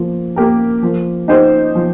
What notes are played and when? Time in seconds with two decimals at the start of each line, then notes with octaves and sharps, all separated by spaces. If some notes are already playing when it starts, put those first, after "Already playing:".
Already playing: F3 A#3
0.36 A#3 G4 A#4
0.83 F3
1.28 D#4 G4 C5
1.75 F3